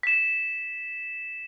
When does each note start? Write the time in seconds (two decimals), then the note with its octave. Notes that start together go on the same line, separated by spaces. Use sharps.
0.03 B6 E7